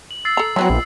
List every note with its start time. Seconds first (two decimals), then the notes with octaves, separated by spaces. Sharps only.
0.11 F#7
0.25 E6 A6 C7
0.37 A4 A#5
0.56 E3 F#3 B3 C4
0.70 A#1